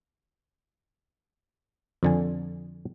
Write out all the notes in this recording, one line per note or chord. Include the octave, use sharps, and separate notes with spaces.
F2 D3 G#5